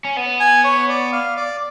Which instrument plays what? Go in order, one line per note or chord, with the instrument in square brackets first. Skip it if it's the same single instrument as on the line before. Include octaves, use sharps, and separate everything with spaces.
[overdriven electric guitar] C#4
B3
[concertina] G#5
C#5
D5
F5
D5